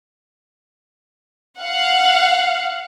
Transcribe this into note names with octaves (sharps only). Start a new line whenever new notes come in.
F5 F#5